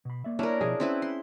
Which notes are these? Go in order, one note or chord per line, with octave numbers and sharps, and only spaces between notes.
B2 B5
A#3 D5 E5
C#4 D4 E4 A#4
B2 F3 G#4 D#5
C4 C#4 E4 B4
C6